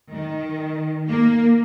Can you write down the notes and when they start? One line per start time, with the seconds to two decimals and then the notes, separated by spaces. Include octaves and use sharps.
0.11 D#3
1.08 A#3